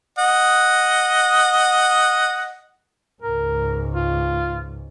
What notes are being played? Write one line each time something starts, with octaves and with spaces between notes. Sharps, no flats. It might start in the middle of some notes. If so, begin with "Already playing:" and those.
D#5 F#5
C#2 G#2 A#4
F4